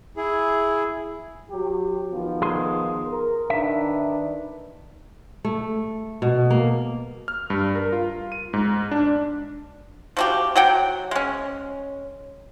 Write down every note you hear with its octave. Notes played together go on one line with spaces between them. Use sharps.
E4 G#4
F#3 G4
D#3 F3 B3
G#4 C6
A#4
D#3 D4 B4 E5
A3
B2
A#3
F6
G2
A#4
F4
D#7
G#2
D4
F3 F#4 G4
F#3 F#5 G5
G#3 C#4